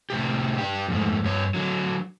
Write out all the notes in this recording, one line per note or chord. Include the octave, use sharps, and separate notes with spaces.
A2 C3 G4
D4 G4
F2 G#2 A3
G2 C#5
D3 F#3